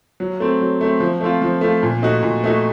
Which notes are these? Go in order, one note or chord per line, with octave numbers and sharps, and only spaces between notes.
F#3
A3 C4
F#3
A3 C4
F3
A3 C4 F4
F3
A3 C4 F4
A#2
A3 D#4 F#4
A#2
A3 D#4 F#4